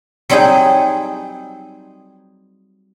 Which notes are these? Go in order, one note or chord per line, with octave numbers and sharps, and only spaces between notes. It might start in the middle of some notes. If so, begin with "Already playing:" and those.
F#3 G3 C4 D#4 G#4